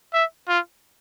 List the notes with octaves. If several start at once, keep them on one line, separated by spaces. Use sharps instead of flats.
E5
F4